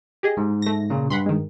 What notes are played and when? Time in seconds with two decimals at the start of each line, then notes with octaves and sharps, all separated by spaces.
0.23 G4 G#4 D#5
0.37 G#2
0.62 A3 A#6
0.90 A#2 C#3
1.10 G2 F#5 B5 C6
1.26 D#3 G#3